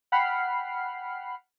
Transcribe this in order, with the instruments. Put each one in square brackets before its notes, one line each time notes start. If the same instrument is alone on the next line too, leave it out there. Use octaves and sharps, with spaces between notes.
[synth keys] F#5 G5 B5 F6 C7